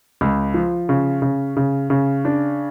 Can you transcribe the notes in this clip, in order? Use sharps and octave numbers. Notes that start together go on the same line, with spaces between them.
C#2
F3
C#3
C#3
C#3
C#3
D4